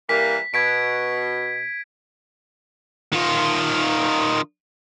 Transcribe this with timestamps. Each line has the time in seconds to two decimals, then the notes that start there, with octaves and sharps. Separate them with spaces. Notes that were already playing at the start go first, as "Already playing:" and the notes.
0.09 E3 G3 A#3 B6
0.54 B2 G#6 B6 D7
3.12 D#3 F4